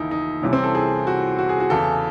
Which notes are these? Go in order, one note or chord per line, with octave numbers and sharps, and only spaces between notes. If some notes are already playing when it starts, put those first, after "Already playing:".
Already playing: D#2 C#3 E3 D#4 E4
D#4
C2 C3 E3 C#4
C4
A4
G#4
F#4
F#4
G#4
F#4
E2 C#3 E3 A4